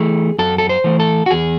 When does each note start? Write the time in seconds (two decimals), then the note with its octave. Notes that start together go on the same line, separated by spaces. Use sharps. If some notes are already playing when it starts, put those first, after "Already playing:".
Already playing: E3 A3 G#4
0.39 F#2 A4
0.58 A4
0.69 C5
0.84 E3 A3
1.00 A4
1.26 F#4
1.31 E2 G#4